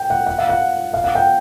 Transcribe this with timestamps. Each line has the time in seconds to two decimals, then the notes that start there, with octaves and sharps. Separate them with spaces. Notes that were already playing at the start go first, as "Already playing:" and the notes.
Already playing: G5
0.10 F#5
0.26 F#5
0.38 F5
0.49 F#5
0.94 F5
1.04 F#5
1.15 G5